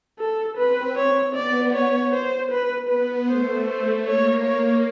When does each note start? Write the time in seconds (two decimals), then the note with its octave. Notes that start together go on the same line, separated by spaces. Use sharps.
0.19 A4
0.57 C4 B4
0.96 C#5
1.35 B3 D5
1.73 C#5
2.13 C5
2.51 B4
2.89 B3 B4
3.28 A3 C5
3.67 C5
4.06 A#3 C#5
4.44 C#5